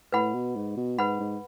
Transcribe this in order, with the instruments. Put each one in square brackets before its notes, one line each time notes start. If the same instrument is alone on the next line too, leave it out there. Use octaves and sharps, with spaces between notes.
[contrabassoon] A2 [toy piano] B4 F#5 B5
[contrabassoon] B2
G#2
B2
[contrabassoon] G#2 [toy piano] B4 F#5 B5
[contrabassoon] G#2